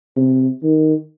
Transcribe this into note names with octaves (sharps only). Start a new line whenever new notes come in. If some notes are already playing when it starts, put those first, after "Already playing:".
C3
D#3